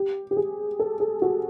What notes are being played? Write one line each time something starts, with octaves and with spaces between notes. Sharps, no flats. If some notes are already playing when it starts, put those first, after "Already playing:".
Already playing: G4
G4
G#4
A4
G#4
F#4